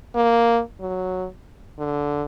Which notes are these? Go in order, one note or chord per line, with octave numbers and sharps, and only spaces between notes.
A#3
F#3
D3